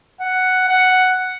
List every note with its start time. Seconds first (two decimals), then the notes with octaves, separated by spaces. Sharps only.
0.21 F#5
0.69 F#5